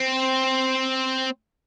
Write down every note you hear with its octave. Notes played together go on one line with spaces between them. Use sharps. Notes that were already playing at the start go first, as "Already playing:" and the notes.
Already playing: C4